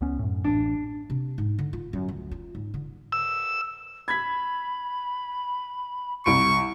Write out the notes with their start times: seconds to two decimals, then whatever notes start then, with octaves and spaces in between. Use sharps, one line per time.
0.01 C#2 B3 C#4
0.19 F#2 A2
0.44 A1 D4
1.10 C3
1.38 G#2
1.59 D3
1.73 F4
1.93 F#2
2.08 D2
2.31 F4
2.55 G#2
2.74 D3
3.12 E6
4.08 B5 G#6 B6
6.26 C2 B5 C#6 D7